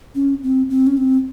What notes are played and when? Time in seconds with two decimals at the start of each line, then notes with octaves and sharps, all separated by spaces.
0.15 C#4
0.43 C4
0.70 C4
0.87 C#4
0.97 C4